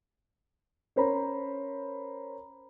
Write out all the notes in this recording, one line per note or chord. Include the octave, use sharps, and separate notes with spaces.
C#4 A#4 C5 C#5 A#5 B5